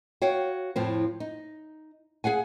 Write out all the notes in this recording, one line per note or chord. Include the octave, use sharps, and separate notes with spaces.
F#4 C#5 F5 G5
F2 A2 F3 C4
D#4
G#4 F5 F#5 G#5